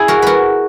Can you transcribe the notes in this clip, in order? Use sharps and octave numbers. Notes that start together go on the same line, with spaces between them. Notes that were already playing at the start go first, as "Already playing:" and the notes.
Already playing: E4 G#4
F#4 A#4
F#4 A#4 B4